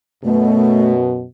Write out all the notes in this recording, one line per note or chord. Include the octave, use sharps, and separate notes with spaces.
F#2 B2 A3